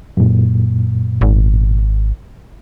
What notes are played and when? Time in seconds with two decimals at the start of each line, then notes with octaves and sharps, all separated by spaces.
0.17 F#2 A#2
1.21 G#1